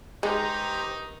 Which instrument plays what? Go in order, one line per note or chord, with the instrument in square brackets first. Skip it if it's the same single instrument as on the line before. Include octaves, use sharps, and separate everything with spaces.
[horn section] G2 D#3 D#4 [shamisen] G#3 [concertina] G4 C5 A#5